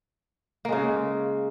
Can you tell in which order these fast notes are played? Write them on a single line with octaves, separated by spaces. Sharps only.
A#3 G#3 C#3